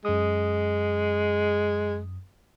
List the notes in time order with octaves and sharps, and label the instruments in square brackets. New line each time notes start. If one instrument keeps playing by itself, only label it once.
[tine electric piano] F#2 D#6 [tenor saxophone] G#3